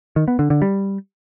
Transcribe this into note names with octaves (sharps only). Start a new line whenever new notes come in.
D#3
B3
D3
D3
G3